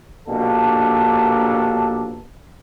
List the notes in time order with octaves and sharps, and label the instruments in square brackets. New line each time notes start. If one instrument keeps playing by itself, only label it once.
[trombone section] A#1 B2 A#3 D4 G4 A4